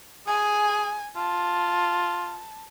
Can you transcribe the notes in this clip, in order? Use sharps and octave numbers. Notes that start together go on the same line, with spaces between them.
G#4 G#5
F4 A5